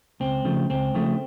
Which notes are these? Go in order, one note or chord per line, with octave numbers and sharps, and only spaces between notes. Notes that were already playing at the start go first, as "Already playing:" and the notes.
C#2 C4
C#3 F3 A3
C#2 C4
C#3 F3 A3